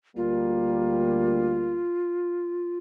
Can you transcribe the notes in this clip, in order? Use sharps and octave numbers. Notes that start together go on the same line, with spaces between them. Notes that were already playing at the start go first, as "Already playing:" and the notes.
D2 G3 A#3 F4